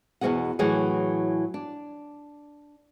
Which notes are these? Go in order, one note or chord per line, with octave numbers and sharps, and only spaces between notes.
E2 B2 E3 F#4 G#4 F#5
A2 E3 F#3 F#4 G#4
D4